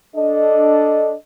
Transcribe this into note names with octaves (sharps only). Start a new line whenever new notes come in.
D4 A4 D#5